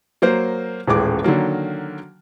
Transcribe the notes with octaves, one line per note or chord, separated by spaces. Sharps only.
F#3 A#3 C5
D#1 A1 G#3 D6
D3 D#3 F#3 A#3